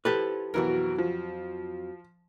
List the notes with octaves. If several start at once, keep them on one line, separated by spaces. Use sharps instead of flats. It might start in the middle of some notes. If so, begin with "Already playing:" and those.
F3 E4 G4 A4 B4
F2 B2 E3 F#3 F#4 A#4
F3